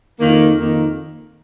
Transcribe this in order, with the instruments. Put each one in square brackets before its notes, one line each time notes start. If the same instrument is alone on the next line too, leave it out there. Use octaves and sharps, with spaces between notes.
[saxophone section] F2 D#3 A#3
F2 D#3 A#3